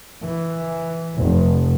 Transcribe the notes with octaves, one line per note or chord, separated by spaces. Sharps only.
E3
F1